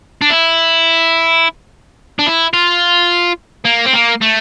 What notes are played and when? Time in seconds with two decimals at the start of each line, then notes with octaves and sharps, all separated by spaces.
0.21 D4
0.30 E4
2.19 D4
2.26 E4
2.53 F4
3.65 A#3
3.86 C4
3.94 A#3
4.22 A3